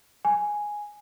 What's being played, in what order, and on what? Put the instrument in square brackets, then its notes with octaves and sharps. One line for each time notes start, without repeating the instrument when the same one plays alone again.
[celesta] G#5